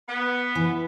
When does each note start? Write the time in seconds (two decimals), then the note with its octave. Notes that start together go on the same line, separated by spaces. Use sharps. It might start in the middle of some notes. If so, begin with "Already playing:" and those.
0.09 B3
0.55 E3